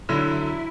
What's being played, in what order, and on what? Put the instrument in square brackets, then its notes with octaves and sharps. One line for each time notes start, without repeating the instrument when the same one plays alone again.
[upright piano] D3 F#3 [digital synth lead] E4